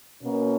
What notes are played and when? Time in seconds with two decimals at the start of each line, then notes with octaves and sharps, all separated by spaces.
0.22 B2 A#3 C#4